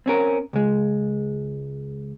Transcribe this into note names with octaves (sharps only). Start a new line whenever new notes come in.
C4 C#4 A#4
C#2 G#3